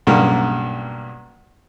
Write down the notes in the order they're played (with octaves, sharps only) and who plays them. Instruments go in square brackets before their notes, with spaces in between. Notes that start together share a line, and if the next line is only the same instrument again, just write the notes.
[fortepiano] B1 G2 C#3 A#3